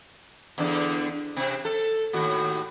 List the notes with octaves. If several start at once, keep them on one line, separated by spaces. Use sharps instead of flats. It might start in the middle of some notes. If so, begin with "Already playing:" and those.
E2 D3 D4
C3 C4
A4
D#2 A2 F#4